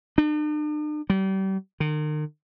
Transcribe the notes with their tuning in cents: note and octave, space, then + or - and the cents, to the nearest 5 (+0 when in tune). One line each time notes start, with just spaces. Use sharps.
D4 +45
G3 -35
D#3 -40